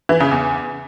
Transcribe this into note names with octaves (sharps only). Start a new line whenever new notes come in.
E3
C#3
E2